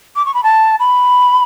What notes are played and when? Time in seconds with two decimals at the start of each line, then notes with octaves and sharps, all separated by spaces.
0.16 D6
0.26 C#6
0.34 B5
0.43 A5
0.80 B5